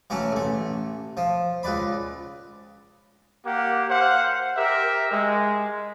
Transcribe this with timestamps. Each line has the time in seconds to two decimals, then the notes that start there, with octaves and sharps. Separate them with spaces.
0.10 E3 F#3 A3 C#4
0.32 A1 A3
1.17 F3
1.63 C#2 B4 D5 B5
3.46 A#3 G4 F#5
3.90 C5 F5 F#5
4.56 G4 A#4 E5
5.12 G#3